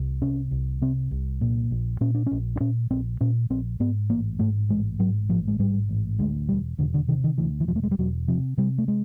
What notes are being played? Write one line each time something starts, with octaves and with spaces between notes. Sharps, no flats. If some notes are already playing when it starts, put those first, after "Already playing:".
Already playing: C2
C3 C#4
C2
C3 C4
C2
A#2
A#1
A#2 C#4
D4
A#1 C#4
D4
A#2 C#4
A#1 C4
A#2 C#4
A#1 C4
G#2 B3
A1 A#3
G#2 A3
A1 G#3
G#2 F#3
A1 F3
G#3
G#2 G3
A1
D2 G#3
E1 G3
E1 D3
D3
C3 D#3
D#3
D2 E3
E3
E1 F3
A3
G#3
G3
E1 F#3
C3 F3
C3 G3
A3
G#3